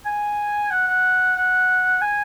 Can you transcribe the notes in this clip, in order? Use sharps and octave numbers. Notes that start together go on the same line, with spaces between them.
G#5
F#5
F#5
F#5
G#5